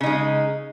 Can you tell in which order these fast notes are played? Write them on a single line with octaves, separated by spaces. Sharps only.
C#3 D#4 G#3